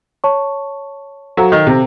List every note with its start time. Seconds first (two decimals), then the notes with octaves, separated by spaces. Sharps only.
0.24 C#5 A5 C#6
1.37 F#3 A4 C5 F5 A#5
1.52 D#3
1.67 C3